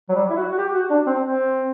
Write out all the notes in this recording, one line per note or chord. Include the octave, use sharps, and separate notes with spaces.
F#3
G3
E4
F#4
F#4
G4
F#4
D4
C4
C4